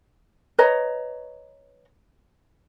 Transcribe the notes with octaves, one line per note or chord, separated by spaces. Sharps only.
B4 C#5 D#5 A#5